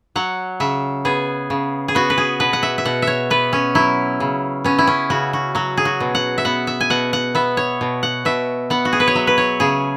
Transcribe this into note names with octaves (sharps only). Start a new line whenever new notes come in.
F#3 F#5
C#3 E5
B3 G#4
C#3
G#4
B3 F#4
B4
G#4
B2 B4
F#5
E5
E5
B2 F#5
E5
C#5
B3 B4
C#4
F#3 E4
C#3
B3 C#4
E4
C#4
C#3 F#4
F#4
F#3 F#4
G#4
F#4
B2
F#5
E5
B3 F#5
E5
G#5
B2 F#5
F#5
B3 E5
C#5
B2
F#5
B2 E5
B3 F#5
F#4
G#4
B4
C#5
F#3 E5
B4
C#5
C#3 G#4